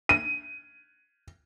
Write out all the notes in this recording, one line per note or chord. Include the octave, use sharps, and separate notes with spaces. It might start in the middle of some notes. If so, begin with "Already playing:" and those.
D#7